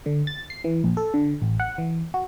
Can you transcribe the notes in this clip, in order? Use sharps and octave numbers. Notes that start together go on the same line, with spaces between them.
D3
A6
C7
E3
A#1
A4
D3
A1
F#5
E3
F#4